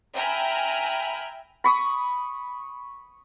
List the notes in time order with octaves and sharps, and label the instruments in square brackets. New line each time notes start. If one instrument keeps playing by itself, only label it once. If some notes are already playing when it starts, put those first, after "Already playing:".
[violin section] E5 G5 G#5 A#5 B5 F6
[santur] B5 C#6 D#6